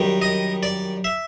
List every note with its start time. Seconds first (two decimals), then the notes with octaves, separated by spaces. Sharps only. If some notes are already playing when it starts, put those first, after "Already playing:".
Already playing: F#2 D#3 G3
0.22 D#5
0.63 D5
1.04 E5